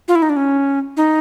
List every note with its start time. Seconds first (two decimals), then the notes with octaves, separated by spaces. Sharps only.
0.08 F4
0.15 E4
0.22 D#4
0.30 D4
0.37 C#4
0.97 D#4